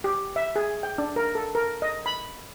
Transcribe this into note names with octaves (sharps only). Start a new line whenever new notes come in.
G4
E5
G#4
G5
D4
A#4
A4
A#4
D#5
B5